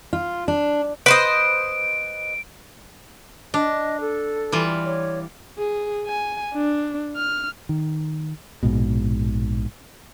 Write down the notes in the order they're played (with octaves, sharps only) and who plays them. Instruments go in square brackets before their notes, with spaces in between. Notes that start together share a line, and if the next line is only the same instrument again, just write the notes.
[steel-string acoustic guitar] F4
D4
[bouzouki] B4 C5 D#5 [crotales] D7
[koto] D4 [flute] D#5
[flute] A4
[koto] E3 G3 F4
[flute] C#5
[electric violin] G#4
G#5
D4
F6
[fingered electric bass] D#3
A#1 G#2 B2